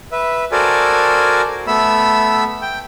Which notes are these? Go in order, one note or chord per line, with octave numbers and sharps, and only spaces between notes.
B4 E5
F#4 A4 A#4 C5 D5 G#5
A3 B3 E5 B5 E6
G5